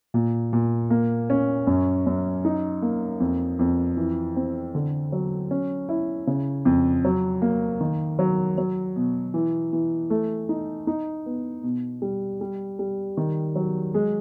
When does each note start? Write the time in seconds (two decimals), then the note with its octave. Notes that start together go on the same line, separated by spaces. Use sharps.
0.14 A#2
0.53 A#2
0.90 A#3
1.30 C#4
1.67 F#2
2.06 F#2
2.45 D#4
2.82 A#3
3.20 F2
3.59 F2
3.97 E3
4.36 C4
4.75 D3
5.12 F#3
5.51 C#4
5.89 E4
6.27 C#3
6.65 F2
7.05 F#3
7.42 A#3
7.81 D#3
8.19 F#3
8.58 F#3
8.96 B2
9.34 E3
9.73 E3
10.10 A3
10.49 D#4
10.87 D#4
11.26 B3
11.63 B2
12.02 G3
12.41 G3
12.79 G3
13.17 D#3
13.56 F#3
13.94 G#3